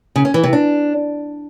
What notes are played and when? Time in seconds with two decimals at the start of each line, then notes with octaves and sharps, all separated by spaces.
0.16 C#3
0.25 C#4
0.34 E3
0.43 C3
0.53 D4